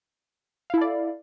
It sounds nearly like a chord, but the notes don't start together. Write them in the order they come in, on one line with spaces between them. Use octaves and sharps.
F5 E4 A4 D5